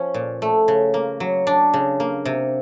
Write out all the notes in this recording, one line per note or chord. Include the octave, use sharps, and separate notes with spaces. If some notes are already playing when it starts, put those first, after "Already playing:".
Already playing: F3 C#4
A#2
A3
C#3
A#3
F#3
D4
C#3
A#3
C3